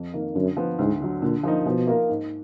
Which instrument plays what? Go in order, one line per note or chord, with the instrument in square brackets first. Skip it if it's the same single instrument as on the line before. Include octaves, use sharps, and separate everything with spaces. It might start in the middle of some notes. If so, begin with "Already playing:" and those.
Already playing: [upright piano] F2
D#3 A#3
[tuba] F#2 [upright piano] D3
[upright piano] F3 B3
[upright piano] D2 [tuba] G#2
[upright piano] D3 F#3
[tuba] A#2 [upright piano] D3
[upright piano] F3 A#3 D#4
[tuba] B2 [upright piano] F3
[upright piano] A#3 F4 A#4
G#2